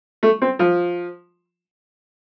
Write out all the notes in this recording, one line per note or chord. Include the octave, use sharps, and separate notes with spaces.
A3
C4
F3